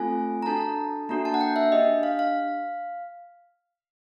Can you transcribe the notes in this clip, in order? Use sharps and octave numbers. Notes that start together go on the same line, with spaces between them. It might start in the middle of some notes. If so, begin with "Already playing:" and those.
Already playing: A3 C4 F4 A4 G#5
A#5
D4 F#4 A4 A5
A#3 D4 F#4 A4 A#5
A5
F#5
G5
E5
D4 G4 D#5
F5
F5